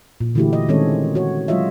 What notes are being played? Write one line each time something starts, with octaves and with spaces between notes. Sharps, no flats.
A#2
D3 E3 A3 E4 F#4 G4
D#5
D#3 G#3 C4 C#4 A4 C#5
F#4 C#5
F#3 G#3 F4 C#5 D#5 E5